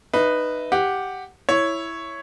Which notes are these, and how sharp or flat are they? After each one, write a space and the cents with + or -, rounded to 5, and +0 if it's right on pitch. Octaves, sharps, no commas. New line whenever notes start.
D#4 -20 B4 +0 E5 +0
G4 +0 F#5 +0
E4 +0 C#5 +0